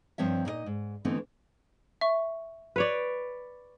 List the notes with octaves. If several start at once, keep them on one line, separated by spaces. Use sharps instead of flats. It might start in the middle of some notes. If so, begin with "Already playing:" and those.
G2 F3 C4 C#5 E5
A#2 D#4 C5 D#5
G#2
D3 E3 A3 B3 C4 D#4
E5 C#6
B4 C#5 D5